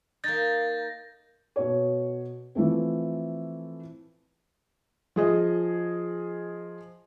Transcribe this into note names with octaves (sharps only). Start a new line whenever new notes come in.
A#3 D#4 G6 A6 A#6
B2 C#5
E3 F3 A3 C4
F3 G#4 D#5